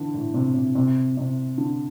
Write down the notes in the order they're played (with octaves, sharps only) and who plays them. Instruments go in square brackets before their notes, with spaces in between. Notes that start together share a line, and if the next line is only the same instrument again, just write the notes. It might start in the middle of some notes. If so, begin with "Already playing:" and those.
Already playing: [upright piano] D3 E3
A2
C3
C3
C3
C3
D3